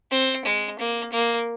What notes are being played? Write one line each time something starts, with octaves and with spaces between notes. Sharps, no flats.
C4
G#3
A#3
A#3